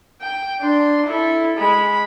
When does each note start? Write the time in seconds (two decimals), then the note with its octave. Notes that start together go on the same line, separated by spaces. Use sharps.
0.21 G5
0.60 D4 C6
1.06 E4 A4
1.57 G#3 B5